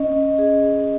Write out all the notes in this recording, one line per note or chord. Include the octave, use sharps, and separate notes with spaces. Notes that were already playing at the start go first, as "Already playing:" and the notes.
Already playing: C#4 D#5
D#5
G#4
G#4